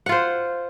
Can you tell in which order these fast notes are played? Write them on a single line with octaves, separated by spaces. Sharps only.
F#5 F4 C5